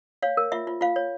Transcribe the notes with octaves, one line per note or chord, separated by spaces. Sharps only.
C#5 F5
A#4
F4 E5
F4
F4 F5
C#5